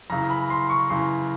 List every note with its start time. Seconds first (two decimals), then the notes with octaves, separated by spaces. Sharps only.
0.10 F#2 C#3 E3 A#5
0.30 B5
0.50 C6
0.69 C#6
0.90 F#2 C#3 E3 C6